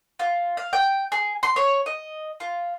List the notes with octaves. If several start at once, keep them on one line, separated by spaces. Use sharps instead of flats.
F4
F5
G5
G#4
C6
C#5
D#5
F4